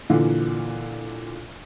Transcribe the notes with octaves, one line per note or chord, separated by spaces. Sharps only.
A#2 D3 E3